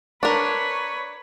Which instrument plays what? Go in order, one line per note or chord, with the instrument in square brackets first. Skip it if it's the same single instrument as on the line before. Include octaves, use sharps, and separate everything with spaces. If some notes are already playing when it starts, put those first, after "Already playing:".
[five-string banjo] D4 A#4 [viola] B4 C#5